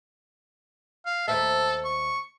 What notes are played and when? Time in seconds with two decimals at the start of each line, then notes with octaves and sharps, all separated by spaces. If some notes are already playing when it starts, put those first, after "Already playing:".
1.06 F5
1.28 D#2 A4 C5 E5
1.85 C#6